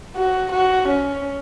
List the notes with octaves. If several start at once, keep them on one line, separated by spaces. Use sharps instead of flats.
F#4
F#4
C#4